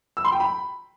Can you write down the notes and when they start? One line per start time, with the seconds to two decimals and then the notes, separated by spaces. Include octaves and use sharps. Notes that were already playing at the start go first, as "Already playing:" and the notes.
0.17 E6
0.25 C6
0.32 G5
0.40 B5